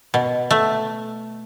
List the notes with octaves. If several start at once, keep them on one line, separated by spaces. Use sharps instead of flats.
B2
A3